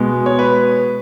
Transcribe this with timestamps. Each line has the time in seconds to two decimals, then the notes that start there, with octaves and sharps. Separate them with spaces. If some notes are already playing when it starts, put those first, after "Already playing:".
Already playing: B2 G#3 B3
0.26 C#5
0.39 B4